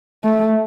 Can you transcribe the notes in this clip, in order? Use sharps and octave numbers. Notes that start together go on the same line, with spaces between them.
A3